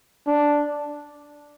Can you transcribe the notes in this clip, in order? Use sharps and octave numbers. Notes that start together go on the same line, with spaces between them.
D4